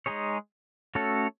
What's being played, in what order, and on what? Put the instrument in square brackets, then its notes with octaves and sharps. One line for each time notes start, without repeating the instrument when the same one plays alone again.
[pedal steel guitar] G#3 D#4 G#4 C#5
A3 C#4 F#4 A4 C#5